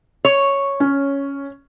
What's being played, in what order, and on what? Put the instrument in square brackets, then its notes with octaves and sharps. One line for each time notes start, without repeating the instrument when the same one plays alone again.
[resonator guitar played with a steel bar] C#5
[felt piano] C#4